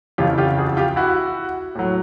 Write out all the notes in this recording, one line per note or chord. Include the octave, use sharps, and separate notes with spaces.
F2 C#3 E3 F4 G4
F4 G4
F#4 G#4
F4 G4
E4 F#4
A2 F#3